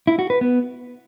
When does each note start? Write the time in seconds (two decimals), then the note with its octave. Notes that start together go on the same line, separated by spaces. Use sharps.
0.07 E4
0.19 F#4
0.30 B4
0.41 B3